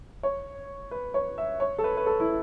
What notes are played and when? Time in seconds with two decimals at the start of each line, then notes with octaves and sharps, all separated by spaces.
0.23 C#5
0.91 B4
1.14 C#5
1.38 E5
1.60 C#5
1.78 A4
1.84 B4
1.97 B4
2.06 A4
2.20 E4